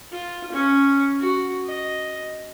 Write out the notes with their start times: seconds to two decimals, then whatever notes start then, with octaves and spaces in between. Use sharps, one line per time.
0.12 F4
0.52 C#4
1.20 F#4
1.65 D#5